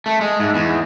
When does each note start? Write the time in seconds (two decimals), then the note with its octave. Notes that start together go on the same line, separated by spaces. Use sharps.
0.06 A3
0.21 G#3
0.40 G#2
0.55 E2